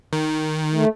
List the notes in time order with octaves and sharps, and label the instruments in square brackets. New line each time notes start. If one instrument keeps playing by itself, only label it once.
[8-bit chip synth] D#3
[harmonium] A3